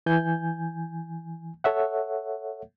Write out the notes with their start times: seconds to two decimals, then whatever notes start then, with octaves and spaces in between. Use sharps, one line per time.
0.06 E3 G#5 G6
1.64 A4 C#5 E5 F#5